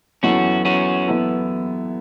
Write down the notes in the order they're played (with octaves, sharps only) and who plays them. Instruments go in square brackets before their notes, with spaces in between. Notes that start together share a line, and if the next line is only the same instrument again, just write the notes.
[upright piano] F#2 E3 B3 E4 A4 [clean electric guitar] C#4 F#4
[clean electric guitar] C#4 F#4
[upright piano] F#2 E3 B3 E4 A4